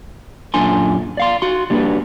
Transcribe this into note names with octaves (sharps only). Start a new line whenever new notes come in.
F#2 A#2 D3 D4 G#5 C6
D5 F5 C6
F#4 C6
G3 A#3 D4 F#4 B4